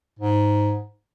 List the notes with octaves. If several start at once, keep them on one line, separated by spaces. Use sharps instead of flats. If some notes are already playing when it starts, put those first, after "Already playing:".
G#2